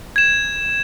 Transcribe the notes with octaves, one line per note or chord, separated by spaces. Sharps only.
G#6 E7